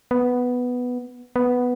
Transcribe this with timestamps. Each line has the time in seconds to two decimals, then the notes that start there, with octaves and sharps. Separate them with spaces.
0.11 B3
1.36 B3